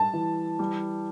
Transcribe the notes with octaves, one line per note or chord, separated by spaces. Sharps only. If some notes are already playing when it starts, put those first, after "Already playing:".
Already playing: G3 A5
E3
G3